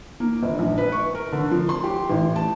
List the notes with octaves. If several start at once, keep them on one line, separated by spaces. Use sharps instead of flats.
A#3
G1
A#1
B4
C#6
A#4
D3
F3
C6
G4
A1
A5